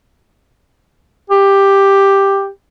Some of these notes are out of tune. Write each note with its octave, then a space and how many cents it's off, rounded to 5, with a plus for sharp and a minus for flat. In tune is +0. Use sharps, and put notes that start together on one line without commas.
G4 +5